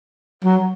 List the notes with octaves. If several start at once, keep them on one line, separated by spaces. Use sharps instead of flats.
F#3